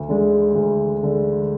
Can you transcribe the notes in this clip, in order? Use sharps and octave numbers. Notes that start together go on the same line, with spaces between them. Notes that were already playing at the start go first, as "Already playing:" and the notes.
Already playing: D2
D3 G#3
D2
D3 G#3